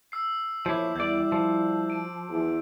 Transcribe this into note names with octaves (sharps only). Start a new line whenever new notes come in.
E6 C7
E2 A#2 F3 E4 C#5 D6 G6
E2 G3 E4 D5 G6
F3
D7 D#7
E2